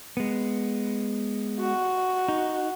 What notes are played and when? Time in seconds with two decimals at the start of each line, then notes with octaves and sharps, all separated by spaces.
0.17 G#3 B3
1.60 F#4
2.28 D#4